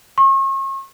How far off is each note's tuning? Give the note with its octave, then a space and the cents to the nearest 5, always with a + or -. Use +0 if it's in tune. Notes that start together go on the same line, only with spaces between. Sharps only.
C#6 -40